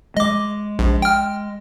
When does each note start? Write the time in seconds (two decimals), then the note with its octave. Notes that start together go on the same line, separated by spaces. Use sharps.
0.17 G#3 D#5 D6
0.79 A#1
1.02 G5 F6